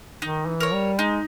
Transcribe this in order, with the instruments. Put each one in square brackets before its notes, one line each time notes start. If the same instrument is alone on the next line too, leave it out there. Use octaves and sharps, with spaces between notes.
[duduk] D#3 [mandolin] D#4
[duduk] E3
[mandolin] A#4 C#5
[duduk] G3
[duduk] G#3 [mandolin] D#4